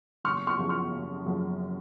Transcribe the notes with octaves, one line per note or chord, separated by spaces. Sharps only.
F#1 C#6 F6
C#6 F6
F#2 F3 G#3
C#6 F6
F#1
F#2 F3 G#3